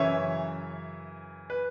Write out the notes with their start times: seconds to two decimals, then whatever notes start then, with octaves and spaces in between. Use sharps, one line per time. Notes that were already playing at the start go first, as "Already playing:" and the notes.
Already playing: F#2 C#3 E3 C#5 E5
1.50 B4